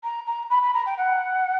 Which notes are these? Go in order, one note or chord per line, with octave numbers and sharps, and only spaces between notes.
A#5
A#5
B5
B5
A#5
G5
F#5